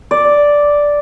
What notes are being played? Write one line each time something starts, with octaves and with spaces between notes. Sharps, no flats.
D5